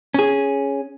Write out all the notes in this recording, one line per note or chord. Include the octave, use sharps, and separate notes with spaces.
C#4 G#4